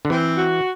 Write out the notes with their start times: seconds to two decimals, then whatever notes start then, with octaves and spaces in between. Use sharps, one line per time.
0.05 D3
0.10 E3 C4
0.38 F#4